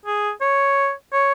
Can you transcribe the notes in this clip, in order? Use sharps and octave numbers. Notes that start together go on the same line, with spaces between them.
G#4
C#5
C#5